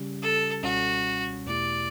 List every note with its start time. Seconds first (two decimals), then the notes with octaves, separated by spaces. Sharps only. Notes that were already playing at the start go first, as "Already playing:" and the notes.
Already playing: C#3 G3 C#4 G4
0.22 A4
0.63 C#2 B2 G3 C#4 F#4
1.46 E2 B2 A3 E4 G4 D5